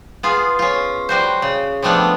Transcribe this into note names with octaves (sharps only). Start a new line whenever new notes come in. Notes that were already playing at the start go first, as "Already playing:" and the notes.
B3 F4 G#4
C#4 F4
G3 F#4 C5
C#3
F3 G3 A3 B3 D4 A4